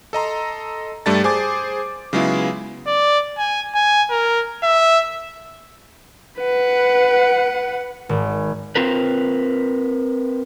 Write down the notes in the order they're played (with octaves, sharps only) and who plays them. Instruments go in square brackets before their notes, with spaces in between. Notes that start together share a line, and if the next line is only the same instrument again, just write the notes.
[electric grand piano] A4 D#5 A#5 C6
G2 G3 A3 D5 A5 A6
G#4 C5 G#5 D6
C#3 F#3 G#3 B3 E4 F4
[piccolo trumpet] D5
G#5
G#5
A#4
E5
[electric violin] B4 F#5
[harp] G#1
[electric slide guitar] C4 F4 A#4 B4